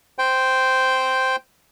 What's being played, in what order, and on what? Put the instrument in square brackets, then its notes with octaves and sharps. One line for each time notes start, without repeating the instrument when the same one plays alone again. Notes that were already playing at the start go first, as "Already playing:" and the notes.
[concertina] C5 G5